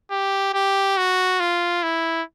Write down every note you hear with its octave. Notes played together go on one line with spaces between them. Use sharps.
G4
G4
F#4
F4
E4